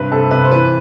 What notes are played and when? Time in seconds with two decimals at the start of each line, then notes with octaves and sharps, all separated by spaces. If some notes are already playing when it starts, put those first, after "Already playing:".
Already playing: G2 C3 B4
0.11 C3 A4
0.31 C3 B4
0.44 C5
0.51 E3 B4